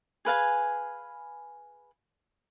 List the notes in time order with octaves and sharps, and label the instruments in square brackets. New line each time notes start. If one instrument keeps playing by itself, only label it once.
[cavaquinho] G#4 B4 F5 G#5